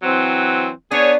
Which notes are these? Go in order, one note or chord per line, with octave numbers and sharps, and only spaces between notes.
E3 F#3 C4
B3 D4 G#4 C#5